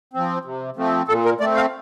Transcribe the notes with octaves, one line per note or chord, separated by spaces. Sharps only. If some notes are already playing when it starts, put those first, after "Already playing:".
F3 C4
C3
F3 A3 C4
A#2 A4
A#4
A3 C4 D5
F5